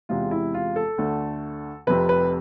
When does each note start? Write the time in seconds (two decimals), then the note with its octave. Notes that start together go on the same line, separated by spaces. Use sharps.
0.09 E2 C3 G#3 F4
0.31 E4
0.54 F4
0.76 A4
0.98 D2 D3 A3
1.87 F1 F2 C3 B4
2.09 B4